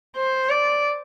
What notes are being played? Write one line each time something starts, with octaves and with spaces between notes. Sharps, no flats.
C5
D5